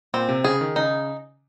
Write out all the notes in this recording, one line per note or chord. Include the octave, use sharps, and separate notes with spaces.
A#2 C4
C3
C#3 G#4
D#3
C#3 D#4